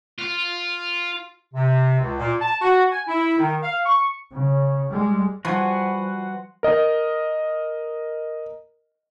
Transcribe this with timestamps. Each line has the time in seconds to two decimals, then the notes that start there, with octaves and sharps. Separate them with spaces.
0.19 F4
1.54 C3
2.00 C#2
2.18 A#2
2.41 A5
2.61 F#4
2.91 G#5
3.07 E4
3.38 D#3
3.62 F5
3.85 C#6
4.31 C#3
4.89 G3 G#3
5.45 F3 G3 F#4 B4 F#5 G#5 C6
6.63 A#4 D#5